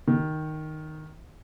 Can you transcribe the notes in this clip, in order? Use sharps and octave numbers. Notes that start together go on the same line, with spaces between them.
D#3